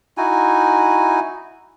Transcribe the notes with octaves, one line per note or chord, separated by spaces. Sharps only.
D#4 E4 F#4 G#5